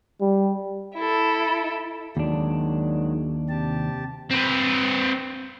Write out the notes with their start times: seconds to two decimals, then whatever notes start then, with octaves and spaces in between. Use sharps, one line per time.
0.21 G3
0.94 E4 A4
2.17 D#2 D#3 F#3 G#3 D4
3.49 C3 G4 A5
4.31 C4 B4